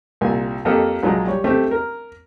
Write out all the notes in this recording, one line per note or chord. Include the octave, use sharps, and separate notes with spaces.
C2 A#2 G#5
F2 A#3 G4 A4 D#5
A#1 A#2 F#3 G#3
G3 C#5
A3 C4 G4
A#4